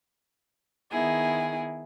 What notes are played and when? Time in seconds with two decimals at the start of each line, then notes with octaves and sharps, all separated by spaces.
0.91 D#3 B3 E4 G#4